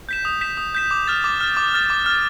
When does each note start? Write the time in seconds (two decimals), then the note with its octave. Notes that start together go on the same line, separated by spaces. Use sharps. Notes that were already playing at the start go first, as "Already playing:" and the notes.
0.09 G6 B6 E7
0.25 D#6
0.41 G6 B6 E7
0.57 D#6
0.75 G6 B6 E7
0.91 D6
1.08 F6 A6
1.24 D6
1.41 F6 A6
1.57 D6
1.74 F6 A6
1.90 D6
2.06 F6 A6